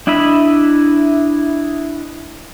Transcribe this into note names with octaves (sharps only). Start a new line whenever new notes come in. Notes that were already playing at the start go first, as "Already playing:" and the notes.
D4 E4 D#5 E5 B5